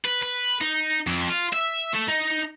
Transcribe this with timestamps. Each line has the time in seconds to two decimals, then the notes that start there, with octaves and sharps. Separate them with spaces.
0.05 B4
0.22 B4
0.61 D#4
1.07 F2
1.30 F4
1.53 E5
1.94 A3
2.08 D#4